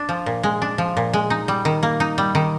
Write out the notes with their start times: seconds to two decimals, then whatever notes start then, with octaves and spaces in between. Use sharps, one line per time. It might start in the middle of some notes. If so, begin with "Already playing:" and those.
Already playing: D4
0.09 F3
0.26 A#2
0.43 G#3
0.62 D4
0.78 F3
0.97 A#2
1.13 G#3
1.30 D#4
1.48 G3
1.65 D#3
1.83 A#3
2.00 D#4
2.18 G3
2.35 D#3